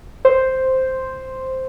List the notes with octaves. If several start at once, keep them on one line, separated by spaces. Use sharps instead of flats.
C5